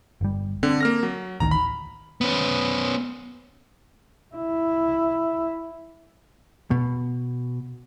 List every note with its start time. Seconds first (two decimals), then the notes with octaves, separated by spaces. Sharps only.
0.21 G1 G3
0.63 D3 C4
0.80 A#3 F6 A#6
1.03 F#3
1.40 A1 D2 D#3 A#5
1.51 B5
2.21 B3 C#4
4.36 E4
6.71 B2